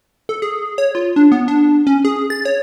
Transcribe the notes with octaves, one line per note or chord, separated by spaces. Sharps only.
A4
G#4
C#5
F4
D4
B3
D4
C#4
G#4
A6
C#5